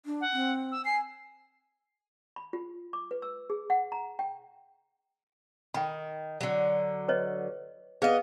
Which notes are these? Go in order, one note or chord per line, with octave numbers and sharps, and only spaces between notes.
D4
F#5
C4
E6
G#5 C7
B5
F4
D6
B4
E6
G#4
F#5
A#5
G5
D#3 G5 B5
D3 F#3
B4 C#5 D#5
B3 G#4 B4 D#5 F5